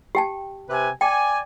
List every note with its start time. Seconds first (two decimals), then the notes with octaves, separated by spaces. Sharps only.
0.15 G4 G5 A5
0.70 C3 B4 G#5
1.01 D5 G5 G#5